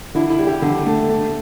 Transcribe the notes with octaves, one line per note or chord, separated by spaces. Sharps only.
D3 E4
E4
G3
G4
D3
A3
A3